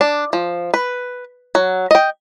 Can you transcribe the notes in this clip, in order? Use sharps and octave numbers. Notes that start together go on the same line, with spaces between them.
D4
F3
B4
F#3
D#5 G5